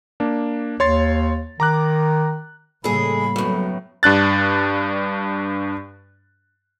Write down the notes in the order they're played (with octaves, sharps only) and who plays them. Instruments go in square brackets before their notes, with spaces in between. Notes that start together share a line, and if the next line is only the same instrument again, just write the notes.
[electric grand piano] A#3 D4
[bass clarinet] D#2 [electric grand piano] C#5 C6 A6
[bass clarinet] D#3 [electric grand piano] A#5 D6 F#6
[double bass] A2 C#3 [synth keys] G3 A#3 A4 [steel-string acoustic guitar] G#3 G#4 [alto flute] B5
[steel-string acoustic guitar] F#2 A2 [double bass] F#3 B3
[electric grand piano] G2 D4 F#6 A6